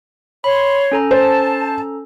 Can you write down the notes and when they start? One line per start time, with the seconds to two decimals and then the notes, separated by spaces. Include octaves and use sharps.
0.44 C#5 B5 C6
0.92 C#4 A4 A#5
1.11 C5 A5